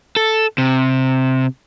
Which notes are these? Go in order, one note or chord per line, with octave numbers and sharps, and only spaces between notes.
A4
C3